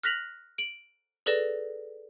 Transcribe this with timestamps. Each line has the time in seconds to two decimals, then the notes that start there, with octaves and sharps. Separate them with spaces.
0.03 F6 F#6 A#6 B6 F7 F#7
0.58 D7 F#7
1.26 G#4 A4 B4 D5 A#6 E7